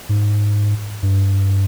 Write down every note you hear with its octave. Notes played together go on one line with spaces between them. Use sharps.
G#2
G2